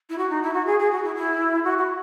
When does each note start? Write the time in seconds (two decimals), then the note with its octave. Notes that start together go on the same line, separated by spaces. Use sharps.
0.09 E4
0.18 F#4
0.29 D#4
0.42 E4
0.54 F#4
0.66 G#4
0.79 G#4
0.92 F#4
1.03 E4
1.15 E4
1.64 F#4
1.78 F#4